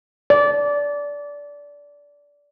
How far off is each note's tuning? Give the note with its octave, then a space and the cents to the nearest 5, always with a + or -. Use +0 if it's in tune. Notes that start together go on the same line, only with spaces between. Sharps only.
D5 -20